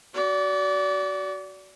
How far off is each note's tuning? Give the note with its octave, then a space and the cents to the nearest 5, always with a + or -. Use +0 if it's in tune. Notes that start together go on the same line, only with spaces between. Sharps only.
F#4 +20 D5 -25